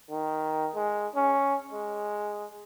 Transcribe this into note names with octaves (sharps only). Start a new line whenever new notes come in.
D#3
G#3
C#4
G#3